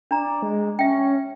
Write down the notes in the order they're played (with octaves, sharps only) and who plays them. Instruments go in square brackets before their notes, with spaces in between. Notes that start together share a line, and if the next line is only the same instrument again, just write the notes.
[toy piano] D4 A#5 [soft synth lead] D5
[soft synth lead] G#3
[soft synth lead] C#4 [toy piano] E5 G5